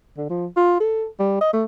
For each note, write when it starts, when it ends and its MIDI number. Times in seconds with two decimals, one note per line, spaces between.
0.17 0.27 50
0.30 0.47 53
0.57 0.77 65
0.80 1.05 69
1.19 1.38 55
1.41 1.49 75
1.53 1.64 57